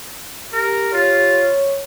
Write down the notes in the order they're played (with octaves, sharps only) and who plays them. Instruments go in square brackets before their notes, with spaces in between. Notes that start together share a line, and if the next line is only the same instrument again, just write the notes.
[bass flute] G4 [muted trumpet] A#4
[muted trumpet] F4 [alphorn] C#5